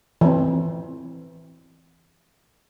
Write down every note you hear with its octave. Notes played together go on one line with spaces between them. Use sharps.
E3 C4